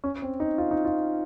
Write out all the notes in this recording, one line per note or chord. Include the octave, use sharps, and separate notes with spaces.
C#4
C4
D#4
F4
D#4
F4